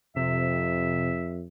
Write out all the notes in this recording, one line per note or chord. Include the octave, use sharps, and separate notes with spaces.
F2 C3 E5